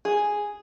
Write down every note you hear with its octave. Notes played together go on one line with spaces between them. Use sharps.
G#4